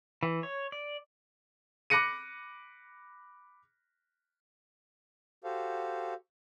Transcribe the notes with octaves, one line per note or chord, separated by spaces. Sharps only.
E3
C#5
D5
B5 D6 F#6 A#6 C#7 D#7
F#4 G4 A4 C5 F5